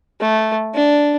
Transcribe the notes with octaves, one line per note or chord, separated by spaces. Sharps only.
A3
D4